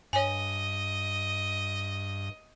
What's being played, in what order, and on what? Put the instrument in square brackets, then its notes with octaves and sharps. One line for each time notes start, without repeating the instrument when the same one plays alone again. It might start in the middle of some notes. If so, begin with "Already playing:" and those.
[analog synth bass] G2 [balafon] C#5 G#5 [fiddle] D#5